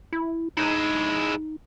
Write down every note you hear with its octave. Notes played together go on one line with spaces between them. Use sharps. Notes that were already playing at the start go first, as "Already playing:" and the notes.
E4
G#3 D#4 E4